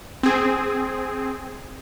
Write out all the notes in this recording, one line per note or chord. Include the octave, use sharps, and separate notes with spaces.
C4 G#4